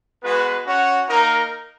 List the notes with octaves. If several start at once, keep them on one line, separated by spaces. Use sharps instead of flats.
G#3 B3 F#4 B4
C#4 F#4 C#5 F#5
A#3 D#4 A#4